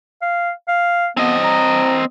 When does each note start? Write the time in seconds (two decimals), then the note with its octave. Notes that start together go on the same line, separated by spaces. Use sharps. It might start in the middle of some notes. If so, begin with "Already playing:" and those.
0.22 F5
0.68 F5
1.17 B3 C4 D#5
1.44 A#5